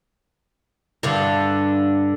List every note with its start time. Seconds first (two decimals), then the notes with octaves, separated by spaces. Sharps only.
1.03 G2 D3